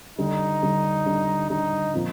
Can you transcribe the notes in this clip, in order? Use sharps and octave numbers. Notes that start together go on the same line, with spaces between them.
D3 G3 D4 D#4
D3 G3 D4
D3 G3 D4
D3 G3 D4 D#4
A#2 F3 C4 F4